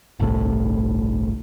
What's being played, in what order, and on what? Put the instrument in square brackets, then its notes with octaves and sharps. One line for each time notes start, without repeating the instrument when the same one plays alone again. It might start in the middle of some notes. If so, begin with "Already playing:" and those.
[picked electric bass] G1 C2 A2